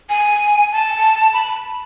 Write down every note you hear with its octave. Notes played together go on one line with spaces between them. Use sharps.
G#5
A5
B5